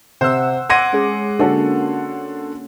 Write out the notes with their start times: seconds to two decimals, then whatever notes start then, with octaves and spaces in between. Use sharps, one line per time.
0.21 C3 C5 F#5 E6
0.70 F#5 C6 D6 G#6 A#6 D#7
0.93 G#3 C#4 G#4
1.39 D3 A#3 C#4 F#4 A4